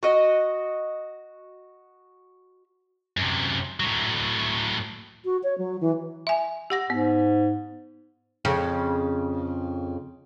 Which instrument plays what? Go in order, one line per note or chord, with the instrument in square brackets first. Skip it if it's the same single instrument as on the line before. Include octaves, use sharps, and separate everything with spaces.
[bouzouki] F#4 D#5
[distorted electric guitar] F#2 C3
A2 F#3
[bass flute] F#4
C#5
F#3
E3
[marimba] E5 G#5
G4 F#5 A#6
[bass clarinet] G#2 [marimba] B3
[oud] F2 C#3